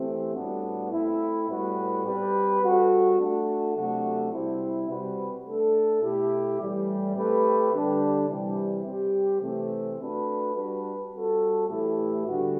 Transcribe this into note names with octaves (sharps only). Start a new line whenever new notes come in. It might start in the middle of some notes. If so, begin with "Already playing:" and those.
Already playing: E3 A3 C4 G4
A2 G3 B3 D4 F#4
A3 C4 E4
A2 G3 B3 F#4 B4
G3 C4 G4 B4
G3 C4 F#4 A4
A3 D4 F#4
C3 F#3 A3 D4 F#4
C3 G3 C4 E4
C3 G3 C4 F#4 B4
A3 D4 A4
B2 A3 E4 G4
A2 E3 G3
A3 C4 G4 B4
D3 G3 D4 G4
C3 E3 G3
G3 C4 G4
C3 E3 A3 C4
A3 D4 F#4 B4
G3 D4 F#4 B4
G3 C4 F#4 A4
A2 E3 A3 E4 G4
D3 G3 B3 F#4